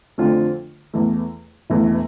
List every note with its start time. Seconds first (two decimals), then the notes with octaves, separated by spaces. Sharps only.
0.18 F2 D3 A3 C4 F4
0.94 E2 E3 A3
1.70 E1 E2 E3 A3